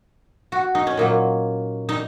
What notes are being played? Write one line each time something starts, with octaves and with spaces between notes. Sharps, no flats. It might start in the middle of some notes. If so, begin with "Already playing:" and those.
F#4
D#4
C#4
A#2 F#3 A#3 D#4
D#4